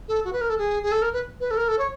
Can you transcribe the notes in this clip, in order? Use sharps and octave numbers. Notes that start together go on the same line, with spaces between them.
A4
F#4
B4
A#4
A4
G#4
G#4
A4
A#4
B4
B4
A4
A#4
A4
C#5